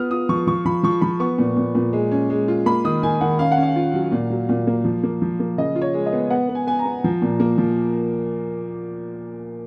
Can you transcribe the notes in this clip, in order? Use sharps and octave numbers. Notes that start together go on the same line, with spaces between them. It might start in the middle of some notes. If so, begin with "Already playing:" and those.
Already playing: B3 F4 D#6 F6
F4 D#6
F3 C#6
F3 C#6
F3 B5
F3 C#6
F3 B5
B3 C#6
A#2
A#2
A#2
G#3
C#4
G#3
F4
A#3 B5
D#3 D#6
D#3 G#5
D#3 F#5
C#4 F5
F#5
C#4
F5
F4
F#3
A#2
F#3
A#2
A#3
F3
A#3
F3
A#3
C#3 D#5
F4
C#5
G#3
D#5
B3
B3 F#5
B3
G#5
B3 G#5
A#5
B3
F3
A#2
A#3
F3